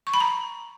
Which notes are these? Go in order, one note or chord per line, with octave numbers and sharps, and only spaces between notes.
C#6
B5
A#5